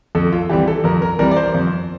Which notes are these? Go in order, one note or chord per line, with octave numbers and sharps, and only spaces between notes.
F2 A4
F4
E3 G3 C4 G4
A4
F2 A#4
A#4
E3 G3 C4 A#4
D5
C5
F2